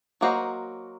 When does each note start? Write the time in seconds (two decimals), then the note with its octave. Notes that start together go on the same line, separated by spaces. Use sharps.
0.21 F#3 A#3 F#4 C5 D#5